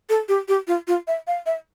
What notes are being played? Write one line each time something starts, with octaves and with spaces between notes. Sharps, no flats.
A4
G4
G4
F4
F4
E5
F5
E5